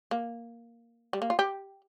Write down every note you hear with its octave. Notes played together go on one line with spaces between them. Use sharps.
A#3
G3
A#3
F4
G4